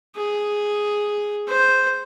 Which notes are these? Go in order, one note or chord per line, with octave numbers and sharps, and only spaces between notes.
G#4
C5